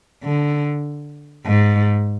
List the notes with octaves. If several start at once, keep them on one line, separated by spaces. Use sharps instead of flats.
D3
G#2